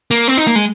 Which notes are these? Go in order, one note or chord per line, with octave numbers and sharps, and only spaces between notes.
A#3
C4
D#4
A#3
G#3